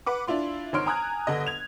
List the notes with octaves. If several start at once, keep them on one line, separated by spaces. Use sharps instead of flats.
B4 F#5 D6
D4 E4 F4 C6
G#1 D#4 C#5 C6 F6 D7
G#5 A#5 D#6 F6 F#6 G#6
G1 D3 D#5
G#6 F7